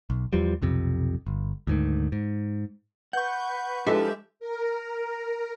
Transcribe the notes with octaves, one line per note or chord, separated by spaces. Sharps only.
B1
E2 E3 F3 G3
B1 F2 C3
G1
D2 G#2 D#3
G#2
B4 F#5 C#6 G6
F3 G#3 D4 E4 F4 G4 A4 E5
A#4